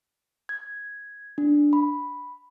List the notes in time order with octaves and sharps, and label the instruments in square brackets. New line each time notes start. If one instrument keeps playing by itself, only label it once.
[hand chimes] G#6
D4
B5